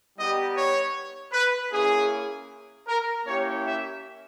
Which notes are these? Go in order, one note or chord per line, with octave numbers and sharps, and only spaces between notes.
G3 B3 D#4 G4 D#5
C#5
B4
A#3 C#4 E4 G#4
A#4
A#3 C#4 E4 G4 C#5
E5